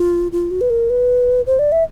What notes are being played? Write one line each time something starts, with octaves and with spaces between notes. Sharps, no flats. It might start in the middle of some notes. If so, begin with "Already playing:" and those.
Already playing: F4
F4
F#4
B4
A#4
B4
C5
D5
E5